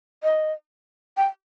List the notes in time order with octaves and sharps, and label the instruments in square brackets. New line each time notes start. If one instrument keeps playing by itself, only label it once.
[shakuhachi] D#5
G5